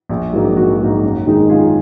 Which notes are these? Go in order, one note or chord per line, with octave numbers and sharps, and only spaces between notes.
A#1
G#2 F#3 A#3 D#4
A#1 F#4
G#2 F#3 A#3 D#4
F#2
D#3 G#3 D#4
F#2 F4 G#4